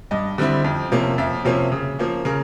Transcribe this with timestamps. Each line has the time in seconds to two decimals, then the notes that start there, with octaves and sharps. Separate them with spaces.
0.11 G2 D#5
0.38 D3 G3 C4 E4
0.64 F2
0.92 C3 F3 A#3 C#4
1.18 F2 E5
1.45 C3 F3 A#3 C#4
1.72 C#3
1.99 F3 A#3 C#4
2.25 C#3 A#4